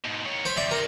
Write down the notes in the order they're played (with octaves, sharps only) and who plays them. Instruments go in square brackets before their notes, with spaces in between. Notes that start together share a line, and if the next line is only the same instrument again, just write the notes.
[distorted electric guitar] G#2 B2
D#3 C#5
[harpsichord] C5 B5
[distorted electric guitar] F2 [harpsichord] D5 E5
[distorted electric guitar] C3 D#4 [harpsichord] A#4